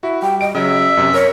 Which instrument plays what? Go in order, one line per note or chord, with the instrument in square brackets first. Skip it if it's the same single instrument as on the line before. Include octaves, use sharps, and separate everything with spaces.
[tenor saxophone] E4 [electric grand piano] F#4
[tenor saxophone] G3 [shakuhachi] G5
[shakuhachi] D#5 [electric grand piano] D7
[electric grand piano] C#3 F#3 [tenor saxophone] E5
[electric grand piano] F#2 C3
[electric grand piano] A#4 C#7 [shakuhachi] C#5